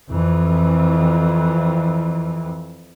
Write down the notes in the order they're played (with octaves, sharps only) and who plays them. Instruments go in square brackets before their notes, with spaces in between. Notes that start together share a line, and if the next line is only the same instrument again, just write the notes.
[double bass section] F2 E3